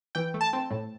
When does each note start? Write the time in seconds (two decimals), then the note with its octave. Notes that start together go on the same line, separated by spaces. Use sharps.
0.15 E3 G5
0.34 A3
0.41 A5
0.53 C4
0.71 A2